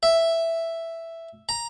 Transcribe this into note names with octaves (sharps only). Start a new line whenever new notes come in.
E5
A#5